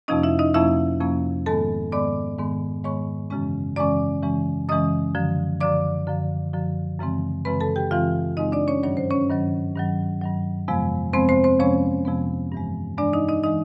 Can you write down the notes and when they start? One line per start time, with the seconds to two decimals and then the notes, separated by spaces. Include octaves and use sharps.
0.08 F2 C3 F3 A#3 C#4 D#4 D#5
0.23 E4 E5
0.39 D#4 D#5
0.54 F2 C3 F3 A#3 C#4 E4 E5
1.00 F2 C3 F3 A#3 C#4
1.46 G#2 D#3 G#3 B3 A4 A5
1.92 G#2 D#3 G#3 B3 D5 D6
2.38 G#2 D#3 G#3 B3
2.84 G#2 D#3 G#3 B3 C#5 C#6
3.30 F#2 C#3 E3 G#3 C#4
3.76 F#2 C#3 E3 G#3 C#4 D5 D6
4.22 F#2 C#3 E3 G#3 C#4
4.69 F#2 C#3 E3 G#3 C#4 D#5 D#6
5.15 F#2 D3 F3
5.61 F#2 D3 F3 D5 D6
6.07 F#2 D3 F3
6.53 F#2 D3 F3
6.99 F#2 C#3 E3 G#3 C4
7.45 F#2 C#3 E3 G#3 C4 B4 B5
7.60 A4 A5
7.76 G4 G5
7.91 F#2 C#3 E3 G#3 C4 F4 F5
8.37 F#2 C#3 E3 G#3 C4 D#4 D#5
8.52 D4 D5
8.68 C#4 C#5
8.83 G2 D#3 F#3 C#5
8.97 C5
9.10 C#4 C#5
9.30 G2 D#3 F#3
9.75 G2 D#3 F#3
10.22 G2 D#3 F#3
10.68 F2 C3 F3 G#3 B3
11.13 F2 C3 F3 G#3 B3 C4 C5
11.29 C4 C5
11.44 C4 C5
11.59 F2 C3 F3 G#3 B3 C#4 C#5
12.05 F2 C3 F3 G#3 B3
12.52 G2 E3 G#3
12.98 G2 E3 G#3 D4 D5
13.13 D#4 D#5
13.28 D#4 D#5
13.43 E3 G#3 D#4 D#5